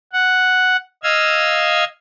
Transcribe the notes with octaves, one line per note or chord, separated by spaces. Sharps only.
F#5
D#5 F5 E6 G#6